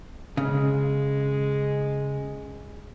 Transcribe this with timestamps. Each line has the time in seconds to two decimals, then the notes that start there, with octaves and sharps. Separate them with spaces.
0.37 C#3 G#3